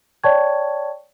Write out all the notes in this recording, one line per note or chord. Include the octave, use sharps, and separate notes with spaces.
C#5 D5 G5 A5 C#6 G#6